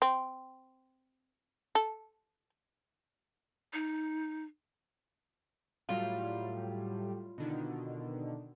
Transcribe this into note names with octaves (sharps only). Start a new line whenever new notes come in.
C4
A4
D#4
A2 F#3 G3 F4
B2 D3 D#3